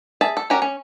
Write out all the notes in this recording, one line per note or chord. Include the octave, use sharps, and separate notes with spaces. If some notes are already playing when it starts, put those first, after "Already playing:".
G#4 E5 A5
A4
C#4 F#4 G4 A#4
C#4